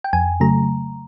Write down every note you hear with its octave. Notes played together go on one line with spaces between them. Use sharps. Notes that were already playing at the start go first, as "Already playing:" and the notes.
G5
F2 G#5
C#3 F#3 A3 A#5